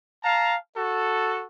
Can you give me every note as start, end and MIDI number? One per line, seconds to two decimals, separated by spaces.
0.23 0.55 77
0.23 0.55 81
0.23 0.55 82
0.76 1.44 66
0.76 1.44 69